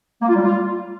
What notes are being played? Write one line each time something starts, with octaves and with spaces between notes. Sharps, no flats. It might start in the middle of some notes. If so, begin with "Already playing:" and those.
A#3
F4
G3
F4